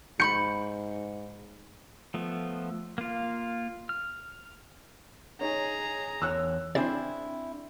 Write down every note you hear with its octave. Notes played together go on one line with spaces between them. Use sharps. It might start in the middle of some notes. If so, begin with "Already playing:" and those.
G#2 B5 C6 G6 C#7
F3 A3 B3
A#3 F4
F6
D#4 G#4 C#5 A#5
E2 C#5 E6 F#6
C4 D4 E4 G#4 D5